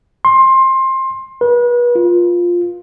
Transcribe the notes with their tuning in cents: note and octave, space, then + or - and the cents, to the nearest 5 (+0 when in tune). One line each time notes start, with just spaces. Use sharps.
C6 +20
B4 -35
F4 +5